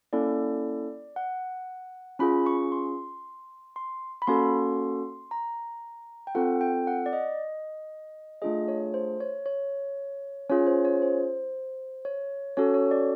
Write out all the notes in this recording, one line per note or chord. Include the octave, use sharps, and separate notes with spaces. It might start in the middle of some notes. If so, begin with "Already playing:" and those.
A#3 C#4 E4 A4 D5
F#5
C#4 F4 G#4 B5
C#6
C6
C6
B5
A#3 C#4 F#4 A4 C6
A#5
G5
C4 F4 A4 F#5
G5
F#5
D5
D#5
A3 D4 F4 G#4 D#5
C#5
C5
C#5
C#5
C#4 F4 G#4 C#5
C5
C#5
C5
C#5
C#4 F#4 A4 C#5
C#5
D5